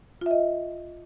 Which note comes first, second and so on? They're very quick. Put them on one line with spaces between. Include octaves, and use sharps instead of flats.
F4 E5 D#5